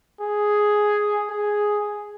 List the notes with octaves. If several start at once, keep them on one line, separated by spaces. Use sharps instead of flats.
G#4
G#4